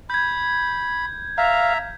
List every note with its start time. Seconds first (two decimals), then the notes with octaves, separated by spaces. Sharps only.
0.10 B5 G6 G#6
1.38 E5 F5 A#5